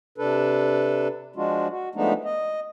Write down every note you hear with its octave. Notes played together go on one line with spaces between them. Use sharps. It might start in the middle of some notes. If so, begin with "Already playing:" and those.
C3 D4 A4 B4
F3 G#3 D4 F4 F#4
F#4
F3 G#3 A3 B3 D4 D#4
D#5